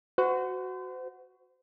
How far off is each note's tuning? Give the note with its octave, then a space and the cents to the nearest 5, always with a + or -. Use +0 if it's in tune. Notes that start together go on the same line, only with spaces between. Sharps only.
F#4 +0 C5 -40